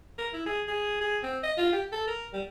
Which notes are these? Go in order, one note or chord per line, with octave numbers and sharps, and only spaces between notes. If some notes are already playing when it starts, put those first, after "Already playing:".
A#4
E4
G#4
G#4
G#4
C4
D#5
F4
G4
A4
A#4
G3